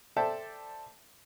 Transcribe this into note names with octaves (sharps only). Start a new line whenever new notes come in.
A4 C5 D5 E5 G5 A5